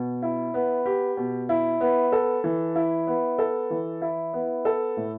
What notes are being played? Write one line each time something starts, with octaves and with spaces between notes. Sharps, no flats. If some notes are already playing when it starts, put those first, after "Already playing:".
Already playing: B2
E4
B3
G4
B2
E4
B3
A4
E3
E4
B3
A4
E3
E4
B3
A4
A2